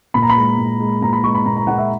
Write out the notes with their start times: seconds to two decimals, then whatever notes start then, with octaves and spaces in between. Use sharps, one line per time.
0.14 A#2 B5
0.22 A#5
0.30 B5
0.36 G#3
0.58 A#2
0.80 G#3
1.02 A#2 A#5
1.13 B5
1.24 G#3 C#6
1.35 B5
1.46 A#2 A#5
1.57 A#5
1.67 G#3 F#5
1.78 E5